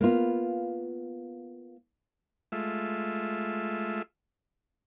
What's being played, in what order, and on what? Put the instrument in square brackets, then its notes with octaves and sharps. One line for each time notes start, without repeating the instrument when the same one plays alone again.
[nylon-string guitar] A#3 B3 F4
[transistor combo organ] G#3 A3 F4 E5